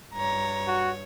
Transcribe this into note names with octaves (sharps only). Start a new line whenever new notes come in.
G2 C#5 A#5
F#4